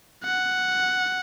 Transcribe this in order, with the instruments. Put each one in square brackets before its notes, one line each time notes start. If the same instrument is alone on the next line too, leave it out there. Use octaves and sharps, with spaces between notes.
[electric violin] F#5